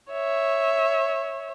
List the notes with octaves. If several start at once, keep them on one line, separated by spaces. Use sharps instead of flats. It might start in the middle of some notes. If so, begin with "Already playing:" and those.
C#5 E5